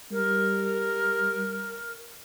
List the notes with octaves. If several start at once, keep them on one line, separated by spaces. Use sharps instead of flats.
G3 A#4